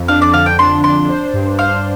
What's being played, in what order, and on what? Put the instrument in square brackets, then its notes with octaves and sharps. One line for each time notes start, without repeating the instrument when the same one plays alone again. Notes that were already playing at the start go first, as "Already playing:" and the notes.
Already playing: [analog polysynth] F2
[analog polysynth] D4 [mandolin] F5
[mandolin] D5
[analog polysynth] D3 [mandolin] F5
[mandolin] G5
[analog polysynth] D4 [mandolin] C6
[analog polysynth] D4 [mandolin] C6
[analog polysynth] C5
G2
[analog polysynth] C5 [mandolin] F5